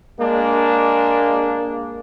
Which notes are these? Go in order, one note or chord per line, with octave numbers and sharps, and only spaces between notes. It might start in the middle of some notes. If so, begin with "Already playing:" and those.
G#3 A#3 D4